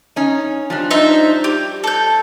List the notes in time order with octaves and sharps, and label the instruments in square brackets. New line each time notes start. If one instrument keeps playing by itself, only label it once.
[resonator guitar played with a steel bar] C#4 D#4
F3 G3 D4
[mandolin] D#4 C5 E5
G4
A4 G6